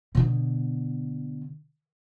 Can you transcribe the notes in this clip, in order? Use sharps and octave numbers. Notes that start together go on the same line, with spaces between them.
B2 D3